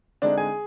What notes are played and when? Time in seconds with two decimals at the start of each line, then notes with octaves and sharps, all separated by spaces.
0.22 D3 G#3 C4 D4 D#4 D5
0.37 G#4 G#5